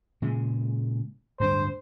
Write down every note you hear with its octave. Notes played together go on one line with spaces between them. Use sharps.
A#2 C#3 G#3
D1 G2 D4 C5